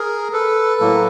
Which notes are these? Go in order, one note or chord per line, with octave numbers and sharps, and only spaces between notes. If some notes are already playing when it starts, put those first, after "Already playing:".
Already playing: G#4 A#4
A4 B4
A2 F#3 A#3